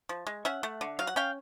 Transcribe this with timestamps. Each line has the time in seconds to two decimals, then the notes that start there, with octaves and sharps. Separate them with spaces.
0.09 F3
0.27 G#3
0.45 C#4 E5 F#5
0.63 A3
0.81 D3
0.99 F#3 F5
1.07 F#5
1.16 C#4 F5 G5